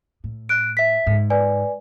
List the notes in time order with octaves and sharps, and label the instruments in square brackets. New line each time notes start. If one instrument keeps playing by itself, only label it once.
[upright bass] A2
[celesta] F#6 D7
E5 B6
[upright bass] G#2
[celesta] B4 D5 G#5